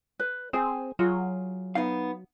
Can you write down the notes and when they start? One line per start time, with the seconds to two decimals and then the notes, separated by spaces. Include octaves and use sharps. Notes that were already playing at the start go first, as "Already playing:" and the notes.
0.19 B4
0.53 C4 G#4 C5 G#5
0.99 F#3 F4 G#4
1.75 B3 D#4 F5